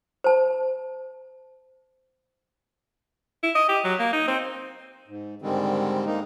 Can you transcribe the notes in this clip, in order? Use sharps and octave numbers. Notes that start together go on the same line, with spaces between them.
C5 A5
E4
D#5
G4
F#3
A#3
D#4
C4
G#2
G#2 D3 D#3 G3 G#3 C4
G#3 A#3 D#4